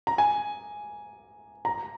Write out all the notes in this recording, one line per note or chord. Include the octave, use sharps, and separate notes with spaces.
A#5
G#5
A#5